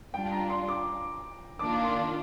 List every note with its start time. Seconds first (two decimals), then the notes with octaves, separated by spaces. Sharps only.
0.13 G3 D4 F4 G5
0.32 A#5
0.50 C6
0.68 D6
1.59 D#3 A#3 D4 F4 D6
1.84 C6